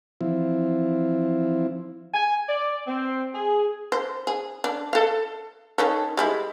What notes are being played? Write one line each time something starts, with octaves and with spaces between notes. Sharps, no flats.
E3 F3 C4 E4
G#5
D5
C4
G#4
C5
G#4
D4
A4 F5
D#3 C#4 A4
G3 G#3 E4